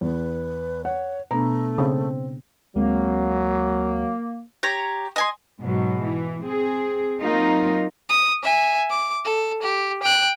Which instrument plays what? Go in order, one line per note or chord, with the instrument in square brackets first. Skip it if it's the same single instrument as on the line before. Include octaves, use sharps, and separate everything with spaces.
[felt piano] E2 [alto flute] B4
[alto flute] C#5 [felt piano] F#5
[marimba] B2 B3 D4 [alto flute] A3 [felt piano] A#5
[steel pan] C#3 [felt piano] C4
[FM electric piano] D2 G#3 C4 [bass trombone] F#3 [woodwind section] A#3
[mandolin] G4 C#5 A#5
D#5 G#5 C6
[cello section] G#2 B2 F#3
E3
C4 G#4
F#3 A#3 C4 D#4 F4 A#4
[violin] D#6
E5 G#5
D6
A4
G4
G5 F#6